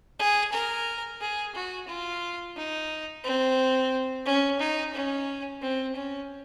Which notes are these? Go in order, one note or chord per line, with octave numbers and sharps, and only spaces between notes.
G#4
A#4
G#4
F#4
F4
D#4
C4
C#4
D#4
C#4
C4
C#4